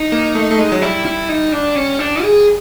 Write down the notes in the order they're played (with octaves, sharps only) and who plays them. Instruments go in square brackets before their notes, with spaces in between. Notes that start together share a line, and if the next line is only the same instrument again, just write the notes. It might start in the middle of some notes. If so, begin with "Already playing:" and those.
Already playing: [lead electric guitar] D#4
[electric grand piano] A#3
A3
A3
G#3
F#3
[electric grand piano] G3 [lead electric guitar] E4
[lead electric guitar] E4
D#4
D4
C#4
D4
G#4